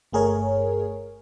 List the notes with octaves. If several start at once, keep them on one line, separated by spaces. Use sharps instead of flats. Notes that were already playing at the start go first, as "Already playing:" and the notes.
G1 A3 G#4 A#4 C#5